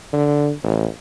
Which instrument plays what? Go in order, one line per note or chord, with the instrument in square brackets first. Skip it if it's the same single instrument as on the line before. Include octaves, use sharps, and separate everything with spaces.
[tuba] D3
A1